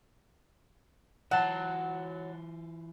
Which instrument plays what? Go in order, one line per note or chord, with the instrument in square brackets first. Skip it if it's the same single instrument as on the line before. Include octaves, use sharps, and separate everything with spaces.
[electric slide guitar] E3 F4 [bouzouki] F#3 [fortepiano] F#5 A5